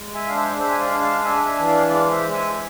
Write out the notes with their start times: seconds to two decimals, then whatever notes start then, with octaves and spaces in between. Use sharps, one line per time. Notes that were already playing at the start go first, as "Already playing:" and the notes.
Already playing: G#3
0.14 E5 G#5
0.26 D4 F5
0.36 C5 E5
0.59 G#3 C5 E5
0.70 G#5
0.80 D5 F5
0.91 D4
1.02 F5 A5
1.24 D4 E5 G#5
1.45 E5 G#5
1.57 E3
1.67 D5 F5
1.89 G#3 D5 F5
2.11 C5 E5
2.22 G#3
2.32 E5 G#5